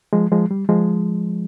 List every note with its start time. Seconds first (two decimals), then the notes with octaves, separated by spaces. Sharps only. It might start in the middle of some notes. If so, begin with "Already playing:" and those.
0.13 F3 G#3
0.32 F3 G#3
0.51 G3
0.69 F3 G#3